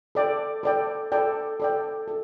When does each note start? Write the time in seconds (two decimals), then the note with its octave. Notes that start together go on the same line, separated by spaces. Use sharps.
0.15 A4 D5 G5
0.63 A4 D5 G5
1.12 A4 D5 G5
1.60 A4 D5 G5
2.08 A4